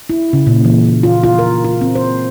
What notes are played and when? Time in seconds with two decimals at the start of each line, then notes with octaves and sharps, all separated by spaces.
0.10 E4
0.33 C#3
0.47 A#2
0.64 E3
1.03 F4
1.23 F4
1.38 A#4
1.64 F4
1.81 C4
1.95 C5